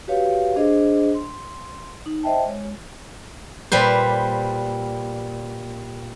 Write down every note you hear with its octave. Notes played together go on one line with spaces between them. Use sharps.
F#4 G4 B4 C#5 F5
D4 G#4 C5 D#5
C6
D#4
C5 D#5 E5 G5 A5
G#3 C#5
A#2 G3 B4 C5